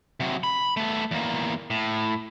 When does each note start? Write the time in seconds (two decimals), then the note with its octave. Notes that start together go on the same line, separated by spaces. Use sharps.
0.20 C3 F#3
0.43 B5
0.77 A3 B3
1.11 E2 A#3
1.70 A2